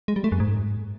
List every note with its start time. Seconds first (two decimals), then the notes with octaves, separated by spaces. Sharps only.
0.08 G#3
0.16 G3
0.24 A3
0.32 F#2
0.40 G#2